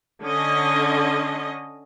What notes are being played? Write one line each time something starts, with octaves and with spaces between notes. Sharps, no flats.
D3 C#4 D#5